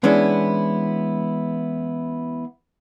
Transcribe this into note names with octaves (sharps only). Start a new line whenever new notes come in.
E3 G#3 B3 C#4 D4 E4